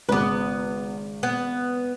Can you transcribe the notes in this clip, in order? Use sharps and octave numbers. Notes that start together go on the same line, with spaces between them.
G#1 C#3 B3 B4 D6
B3